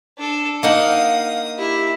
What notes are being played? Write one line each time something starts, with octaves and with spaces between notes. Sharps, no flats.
D4 A4
A#3 D#4 F5 F#5 D#6
E4 G4